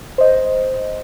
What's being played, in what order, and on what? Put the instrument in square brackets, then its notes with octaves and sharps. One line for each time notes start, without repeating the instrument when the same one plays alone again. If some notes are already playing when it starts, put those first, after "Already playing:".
[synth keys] C5 D#5